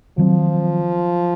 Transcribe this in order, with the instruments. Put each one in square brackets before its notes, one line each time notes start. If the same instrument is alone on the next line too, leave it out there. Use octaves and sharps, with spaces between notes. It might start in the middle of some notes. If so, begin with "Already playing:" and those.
[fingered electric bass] D#3 F#3 C4 [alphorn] F3